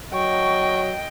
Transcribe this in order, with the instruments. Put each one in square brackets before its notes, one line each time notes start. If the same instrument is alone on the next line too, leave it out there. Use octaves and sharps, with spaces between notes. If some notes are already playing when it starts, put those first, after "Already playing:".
[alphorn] F#3 [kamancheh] D#5 G5 [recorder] C#6